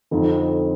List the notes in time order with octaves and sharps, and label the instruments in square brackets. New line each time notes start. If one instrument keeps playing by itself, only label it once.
[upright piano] F2 D3 F3 C4 D#4